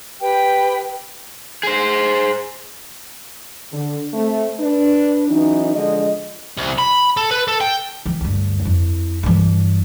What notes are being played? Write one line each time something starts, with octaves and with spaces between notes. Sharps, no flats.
G4 B4 G5
G#4 C5
D3
A3 C4
D4 B4
E3 F#3 C#4 D#4
D3 F3 G#3 D#5
C2
B5
A4
B4
A4
G5
E3
D2 G2
F2 E4
G2 E3